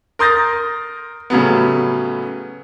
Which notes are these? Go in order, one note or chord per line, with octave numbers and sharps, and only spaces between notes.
A#4 C6 D#6 G6 A6 A#6
A2 C#3 F#3 G3 B3